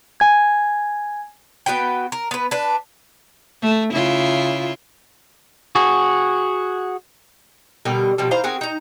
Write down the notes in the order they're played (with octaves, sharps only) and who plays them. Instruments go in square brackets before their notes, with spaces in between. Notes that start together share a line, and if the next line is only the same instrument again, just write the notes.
[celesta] G#5 G#6
[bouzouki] B3 F#4 B4 G5
A#4
B3 B4
D4 B4
[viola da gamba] A3
C#3 E4 F4
[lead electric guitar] F#4 G#4
[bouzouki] B2 D3 G3 A#4
B2 F3 G3
E3 C5 F5 A#5
C4 F#4 G#4 A#4
D#4 A#5